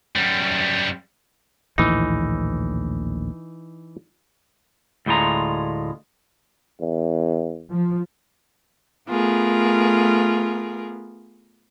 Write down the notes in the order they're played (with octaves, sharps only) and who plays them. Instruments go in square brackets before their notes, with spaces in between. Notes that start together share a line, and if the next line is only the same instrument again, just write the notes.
[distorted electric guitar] F#2 G3
[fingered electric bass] A#1 D#2 A2 [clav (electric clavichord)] E3 D#4
[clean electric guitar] D2 A2 G#3 F4 A#5
[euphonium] E2
[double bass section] F3
[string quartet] A3 B3 F4 G#4 A#4